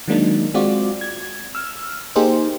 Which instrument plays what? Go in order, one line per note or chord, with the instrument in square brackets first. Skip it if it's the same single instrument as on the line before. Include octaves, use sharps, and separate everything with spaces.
[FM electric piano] D#3 F#3 G#3 A#3 D4 D#4
G#3 C4 F4 F#4 D5
G#6
E6 F6
A#3 D#4 G4 G#4 A#4 C5